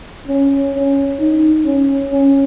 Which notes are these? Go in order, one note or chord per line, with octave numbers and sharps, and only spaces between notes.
C#4
C#4
D#4
C#4
C#4